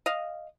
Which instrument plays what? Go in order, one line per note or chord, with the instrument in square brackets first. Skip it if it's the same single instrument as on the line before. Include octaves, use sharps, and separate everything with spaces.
[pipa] D#5 F5